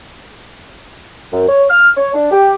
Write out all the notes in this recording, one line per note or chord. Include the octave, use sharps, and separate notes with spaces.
F#2
C#5
F6
C#5
D4
G4